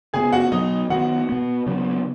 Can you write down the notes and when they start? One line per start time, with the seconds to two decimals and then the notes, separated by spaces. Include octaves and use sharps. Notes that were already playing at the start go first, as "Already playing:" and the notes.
0.14 C#3 B3 G#4 G#5
0.33 F#4 F#5
0.52 B2 F#3 B3 D#4 D#5
0.90 D#3 B3 F#4 F#5
1.29 B2 B3
1.67 C#3 F#3 B3